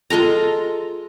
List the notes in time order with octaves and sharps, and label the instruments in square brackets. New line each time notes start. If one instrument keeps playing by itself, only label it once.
[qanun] G#3 F4 A4 A#5